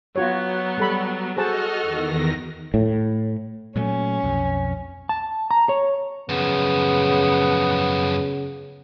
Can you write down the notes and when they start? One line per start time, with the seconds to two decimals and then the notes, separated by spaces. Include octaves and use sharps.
0.16 F#3 B3 F4 F#4 C#5
0.78 G3 A4 B5
1.37 F#4 G#4 A4 C5 D#5 A5 F6
1.82 E2 D#3 A#6
2.74 A2
3.76 A#2 F#3 A3 C#4
4.23 B1 F2
5.09 A5
5.51 A#5
5.69 C#5
6.29 F#2 C#3 F3 B3